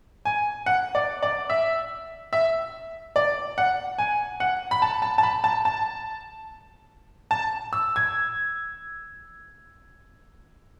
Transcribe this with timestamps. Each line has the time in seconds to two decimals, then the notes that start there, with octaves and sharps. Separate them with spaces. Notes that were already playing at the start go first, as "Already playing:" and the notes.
0.25 G#5
0.66 F#5
0.95 D5
1.23 D5
1.50 E5
2.33 E5
3.16 D5
3.58 F#5
3.98 G#5
4.40 F#5
4.71 B5
4.82 A5
5.02 A5
5.18 A5
5.23 B5
5.44 A5
5.65 A5
7.31 A5
7.73 E6
7.96 G#6